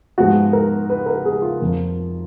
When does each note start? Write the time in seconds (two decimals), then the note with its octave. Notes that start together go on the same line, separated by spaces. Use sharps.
0.18 G#2 F3 G#3 B3 F#4
0.53 A#4
0.90 B4
1.06 A#4
1.25 G#4
1.42 F4
1.60 F2 F3 A#3